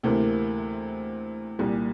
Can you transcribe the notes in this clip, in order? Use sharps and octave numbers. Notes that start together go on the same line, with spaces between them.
D2 C3 E3 A#3
C2 A#2 G3